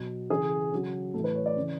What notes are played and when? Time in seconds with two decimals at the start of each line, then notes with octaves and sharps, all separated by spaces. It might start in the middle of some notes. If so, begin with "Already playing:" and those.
Already playing: B2 F#3
0.30 C#3 E3 G#4
0.72 C#3 F#3
1.14 A2 E3 A4
1.24 B4
1.35 C#5
1.46 D5
1.56 C#3 E3